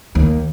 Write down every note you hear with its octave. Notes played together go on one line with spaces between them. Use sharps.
D#2